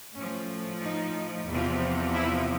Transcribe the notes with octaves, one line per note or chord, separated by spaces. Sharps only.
A2 F3 C#4
D#4
E2 C3 F3
E4